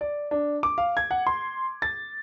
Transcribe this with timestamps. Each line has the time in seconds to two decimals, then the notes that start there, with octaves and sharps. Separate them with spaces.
0.01 D5
0.31 D4
0.63 D6
0.78 F5
0.97 G#6
1.11 F#5
1.27 C6
1.82 A6